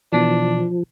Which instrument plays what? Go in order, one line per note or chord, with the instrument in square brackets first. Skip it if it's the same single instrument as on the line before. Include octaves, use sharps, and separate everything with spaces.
[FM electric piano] B2 E3 [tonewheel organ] F3 [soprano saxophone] D4